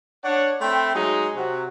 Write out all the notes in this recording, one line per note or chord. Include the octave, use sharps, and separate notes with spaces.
D4 C#5 F#5
A3 C4 E5 G5 B5 C6
F#3 G#3 D#4 G#4
C3 F#3 F#4